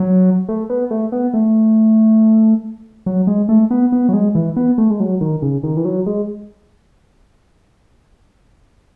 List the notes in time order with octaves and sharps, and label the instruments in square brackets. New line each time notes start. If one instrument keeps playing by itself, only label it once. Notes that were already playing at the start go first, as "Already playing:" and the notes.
Already playing: [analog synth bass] F#3
A3
B3
A3
B3
A3
F#3
G#3
A3
B3
B3
F#3
G#3
E3
B3
A3
G#3
F#3
D#3
C#3
D#3
E3
F#3
G#3